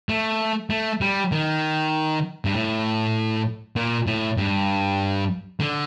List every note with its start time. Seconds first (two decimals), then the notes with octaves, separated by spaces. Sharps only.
0.09 A3
0.70 A3
1.01 G3
1.32 D#3
2.45 G2
2.54 A2
3.76 A#2
4.07 A2
4.37 G2
5.60 D3